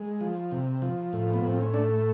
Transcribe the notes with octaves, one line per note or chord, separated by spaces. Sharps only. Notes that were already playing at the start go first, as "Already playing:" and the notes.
Already playing: G#3
F3
C3
F3
A2
B3
A2 C4
C#4
A3 D4